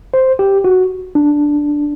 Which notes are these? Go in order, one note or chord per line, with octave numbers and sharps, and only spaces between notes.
C5
G4
F#4
D4